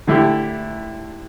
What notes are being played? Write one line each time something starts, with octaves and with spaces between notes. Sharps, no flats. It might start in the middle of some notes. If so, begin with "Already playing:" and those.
D3 A3 E4 G4